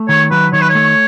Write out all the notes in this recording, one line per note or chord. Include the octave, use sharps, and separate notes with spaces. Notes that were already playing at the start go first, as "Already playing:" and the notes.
Already playing: A3
D#3 C#5
F#3 B4
D#3 C#5
B4
C#5
A3